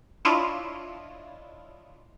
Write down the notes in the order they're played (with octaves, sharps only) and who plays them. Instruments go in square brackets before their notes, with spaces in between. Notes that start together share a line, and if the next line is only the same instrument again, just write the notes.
[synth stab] D4 E4 F4 C#5 D#5